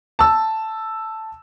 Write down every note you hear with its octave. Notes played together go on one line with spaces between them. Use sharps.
A5 E6